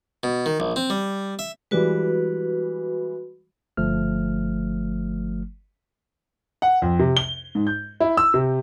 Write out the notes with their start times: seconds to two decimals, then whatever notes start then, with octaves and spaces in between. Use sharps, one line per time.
0.23 B2
0.46 D#3
0.60 A#1
0.76 C4
0.90 G3
1.39 E5
1.71 E3 G3 G#3 F#4 B4
3.77 G1 F3 A3 F6
6.62 F#5
6.82 F2
6.99 C3
7.17 G7
7.55 G#2
7.67 G6
8.00 E4
8.17 E6
8.34 C3